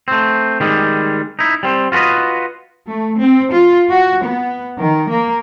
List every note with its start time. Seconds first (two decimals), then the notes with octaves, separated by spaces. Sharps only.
0.08 A3 C4
0.60 D#3 G3 G#3
1.39 D#4 E4
1.63 G3 C4
1.92 F4 F#4 G#4 B4 D#5
2.87 A3
3.18 C4
3.52 F4
3.91 F#4
4.24 B3
4.78 D#3
5.10 A#3